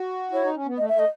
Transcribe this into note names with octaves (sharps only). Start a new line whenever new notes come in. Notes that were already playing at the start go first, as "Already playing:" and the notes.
Already playing: F#4
E4 C#5
D#4
C#4
B3
A3 D#5
E5
A3 D#5